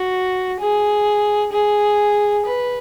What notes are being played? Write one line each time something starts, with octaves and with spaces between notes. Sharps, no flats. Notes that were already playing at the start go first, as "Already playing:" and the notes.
Already playing: F#4
G#4
G#4
B4